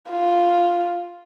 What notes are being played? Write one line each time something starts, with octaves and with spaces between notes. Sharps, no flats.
F4